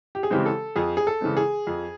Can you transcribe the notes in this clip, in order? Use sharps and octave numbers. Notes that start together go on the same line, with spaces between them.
G4
G#4
C#3 E3 G#3 C4 G4
A4
F2 G#4
G#4
A4
C#3 E3 G#3 C4
G#4
F2